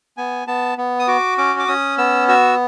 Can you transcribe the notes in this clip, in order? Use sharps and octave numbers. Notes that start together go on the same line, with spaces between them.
B3 G#5
B3 A5
B3
D#6
F#4 D6
C#4 D6
D6
C#4 D#6
B3 E6
F#4 E6